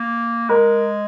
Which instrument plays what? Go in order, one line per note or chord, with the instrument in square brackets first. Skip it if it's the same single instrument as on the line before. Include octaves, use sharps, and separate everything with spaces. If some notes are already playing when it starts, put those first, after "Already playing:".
Already playing: [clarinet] A#3
[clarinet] G#3 [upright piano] A#4